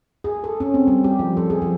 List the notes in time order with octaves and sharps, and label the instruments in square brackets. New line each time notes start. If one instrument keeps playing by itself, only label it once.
[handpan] G#4
A4
C#4
C4
G3
G4
F3
A4
G#4
F3